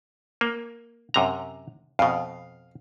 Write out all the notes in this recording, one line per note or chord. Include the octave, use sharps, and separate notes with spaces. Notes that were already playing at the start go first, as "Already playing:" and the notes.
A#3
F#2 C3 A#5
F2 B2 F5